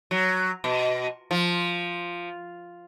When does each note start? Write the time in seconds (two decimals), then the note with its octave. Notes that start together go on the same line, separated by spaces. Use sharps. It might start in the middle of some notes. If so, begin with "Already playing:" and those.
0.11 F#3
0.64 B2
1.31 F3